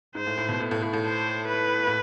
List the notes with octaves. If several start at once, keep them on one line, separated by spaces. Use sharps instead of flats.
G#2 C5
A2
A2
B2
A2
A2
A2
A2
C5
B4
A2